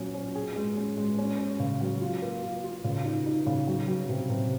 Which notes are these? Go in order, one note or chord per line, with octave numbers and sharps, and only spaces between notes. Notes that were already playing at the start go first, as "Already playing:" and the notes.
Already playing: A#2 F#3 C#4
C#4
G#4
G#3
C#4
G#3
C#4
C#4
C#3
F#3
F4
A#3
F4
F4
C#3
D#4
D#4
C#3
F#3
F#3
C3
C3